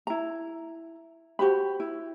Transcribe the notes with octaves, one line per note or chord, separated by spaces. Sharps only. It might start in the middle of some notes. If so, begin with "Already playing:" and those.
E4 A#5
F#4 G4 C5 B5
E4